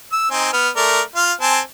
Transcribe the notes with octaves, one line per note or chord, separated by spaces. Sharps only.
E6
C4 D#4 G#5
B3 F6
A3 A#4 D5
F4 F5
C4 G#5 A5